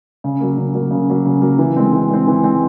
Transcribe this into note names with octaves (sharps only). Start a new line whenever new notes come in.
C#3
F#3 A#3
C#3
F#3 A#3
C#3
F#3 A#3
C#3
F#3 A#3
E3
G#3 C4
E3
G#3 C4
E3
G#3 C4